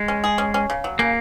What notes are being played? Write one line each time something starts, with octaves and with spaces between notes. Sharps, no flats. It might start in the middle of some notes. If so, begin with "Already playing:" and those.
Already playing: G#3
C#4
G#4
C#4
C#4
C#3
F#3
C#3 A#3